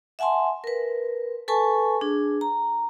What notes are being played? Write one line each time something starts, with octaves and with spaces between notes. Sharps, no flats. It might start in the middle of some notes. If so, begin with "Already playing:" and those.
E5 F#5 G#5 A5 C6
A#4 B4
A4 B4 G#5 A5 C#6
D4 G#4
A#5